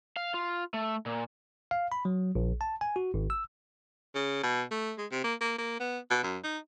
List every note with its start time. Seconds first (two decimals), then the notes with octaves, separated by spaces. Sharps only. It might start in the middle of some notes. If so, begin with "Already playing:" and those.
0.16 F5
0.34 F4
0.74 A3
1.06 A#2
1.71 F5
1.92 B5
2.05 F#3
2.35 A#1
2.61 A5
2.81 G#5
2.96 F#4
3.14 G#1
3.30 E6
4.15 C#3
4.43 B2
4.71 A3
4.98 G#3
5.11 C3
5.24 A#3
5.41 A#3
5.58 A#3
5.80 B3
6.10 B2
6.23 F#2
6.44 D#4